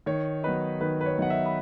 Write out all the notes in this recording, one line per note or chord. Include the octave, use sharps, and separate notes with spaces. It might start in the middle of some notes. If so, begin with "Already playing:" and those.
D#3 C#5
F#3 B3 D#4 B4
D#3 B4
B4
C#5
F#3 B3 D#4 F#5
E5
B5